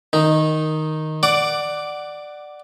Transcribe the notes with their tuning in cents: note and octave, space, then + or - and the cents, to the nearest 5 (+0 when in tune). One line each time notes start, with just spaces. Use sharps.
D#3 +0 D#4 +0
D5 +10 F#5 +10 D6 -5